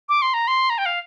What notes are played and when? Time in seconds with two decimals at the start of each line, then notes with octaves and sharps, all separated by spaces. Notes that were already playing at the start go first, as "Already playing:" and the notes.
0.09 D6
0.22 C6
0.34 A#5
0.48 C6
0.70 A#5
0.78 G5
0.86 F5